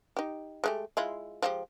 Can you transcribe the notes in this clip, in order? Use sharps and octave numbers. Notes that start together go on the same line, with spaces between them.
D#4 G4
G#3 A3 G4
G#3 E4 F4
F3 G#3 G4